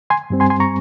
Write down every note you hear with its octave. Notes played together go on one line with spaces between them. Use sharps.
G#5 C6
G2 G3 C4
G#5 C6
G#5 C6
A#5 C#6